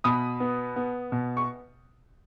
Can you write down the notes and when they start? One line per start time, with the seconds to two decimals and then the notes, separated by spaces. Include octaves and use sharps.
0.04 B2 B5 D#6
0.40 B3
0.76 B3
1.12 B2
1.37 C#6